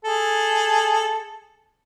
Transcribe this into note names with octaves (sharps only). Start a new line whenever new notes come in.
G#4 A4